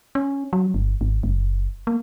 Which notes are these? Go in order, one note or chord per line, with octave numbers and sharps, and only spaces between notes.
C#4
F#3
G1
G#1
F#1
A#3